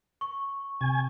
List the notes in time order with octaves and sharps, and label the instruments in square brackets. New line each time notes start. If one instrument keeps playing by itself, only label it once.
[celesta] C#6
[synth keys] C3 [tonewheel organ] G#5